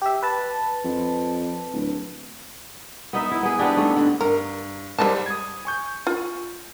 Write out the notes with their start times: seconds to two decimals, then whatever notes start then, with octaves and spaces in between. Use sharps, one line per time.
0.02 G4 E5
0.23 B4 A5
0.84 F2
1.73 D1
3.13 B3 D#4 E5
3.31 E4
3.43 B3 G#4
3.58 B3 C4 D4 G4
3.77 G#2 A3
3.96 D3
4.21 G2 A#4
4.98 G#2 G3 C5 D#5 A5
5.26 D#6 G#6
5.65 G#5 C#6 G6
6.07 F4